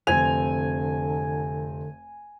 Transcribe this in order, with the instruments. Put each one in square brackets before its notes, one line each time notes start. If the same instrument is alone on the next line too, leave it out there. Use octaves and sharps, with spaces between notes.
[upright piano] F1 C4 F7 [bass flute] D3 [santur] G#5